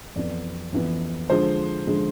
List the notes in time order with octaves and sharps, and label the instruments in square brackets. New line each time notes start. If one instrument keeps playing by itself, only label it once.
[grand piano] F2 E3 B3 D5
F2 E3 B3
D3 F3 G#3 C5
D3 F3 G#3